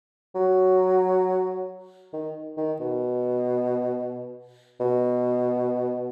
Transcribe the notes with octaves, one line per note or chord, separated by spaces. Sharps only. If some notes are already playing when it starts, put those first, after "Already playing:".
F#3
D#3
D#3
B2
B2